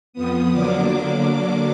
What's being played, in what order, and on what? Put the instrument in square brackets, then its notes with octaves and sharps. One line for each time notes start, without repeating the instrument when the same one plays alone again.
[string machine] F2 F3 B3 D#6
D3 F#3 A#3 D4 D6